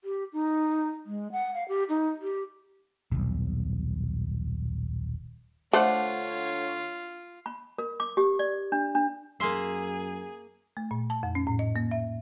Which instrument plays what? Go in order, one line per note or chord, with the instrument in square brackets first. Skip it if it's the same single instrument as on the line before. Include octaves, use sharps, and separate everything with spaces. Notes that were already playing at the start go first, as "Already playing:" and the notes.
[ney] G4
D#4
G#3
F#5
F5
G4
D#4
G4
[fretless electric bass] D#1 B1
[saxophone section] D3 C#5 [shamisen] A3 [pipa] D4 C5 F#5 [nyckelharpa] F4
[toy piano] B5
A#4
D6
G4
D5
D4
D4
[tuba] F#2 [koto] A#3 E5 [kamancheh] G#4 [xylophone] C6 C7
[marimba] A3
A#2
A5
F2
C#4
A2
D#5
A#3
E5